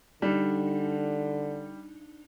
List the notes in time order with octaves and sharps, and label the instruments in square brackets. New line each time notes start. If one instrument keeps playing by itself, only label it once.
[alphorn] D3 [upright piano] G3 [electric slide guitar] D4 D#4